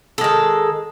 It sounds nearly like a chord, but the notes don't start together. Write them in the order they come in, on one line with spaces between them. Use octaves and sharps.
A4 G#3 D#3